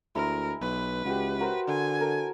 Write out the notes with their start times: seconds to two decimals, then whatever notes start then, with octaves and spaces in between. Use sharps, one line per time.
0.15 D2 G#3 E4 A#4
0.61 B1 B4
1.05 C#2 F#4 G4
1.39 F#4 A#4 C5
1.68 D3 G#5
2.00 A4 A#4